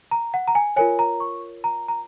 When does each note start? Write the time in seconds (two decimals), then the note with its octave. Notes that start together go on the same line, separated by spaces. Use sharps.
0.11 A#5
0.34 F#5
0.48 A#5
0.55 G#5
0.76 F4 A#4 C#5 G#5
0.99 A#5
1.20 C#6
1.64 A#5
1.88 A#5